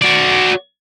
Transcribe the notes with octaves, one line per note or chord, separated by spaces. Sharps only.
F#4 D5